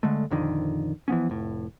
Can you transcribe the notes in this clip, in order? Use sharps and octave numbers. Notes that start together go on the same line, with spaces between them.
D3 G#3 A3
A#1 F2 D3 D#3
E3 F3 B3 C#4
F1 A2